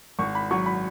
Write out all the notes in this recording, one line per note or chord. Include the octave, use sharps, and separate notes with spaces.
G#1 C#6
B5
F#3 C#6
B5